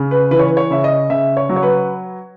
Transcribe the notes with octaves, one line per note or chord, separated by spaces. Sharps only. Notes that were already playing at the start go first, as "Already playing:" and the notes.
Already playing: C#3
B4
E3 B4
C#5
B4
C#5
C#3 E5
D#5
C#3 E5
C#5
F#3
C#5
B4